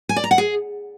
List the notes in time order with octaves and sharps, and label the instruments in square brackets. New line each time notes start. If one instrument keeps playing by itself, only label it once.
[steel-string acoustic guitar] G#5
D5
A#5
F#5
G#4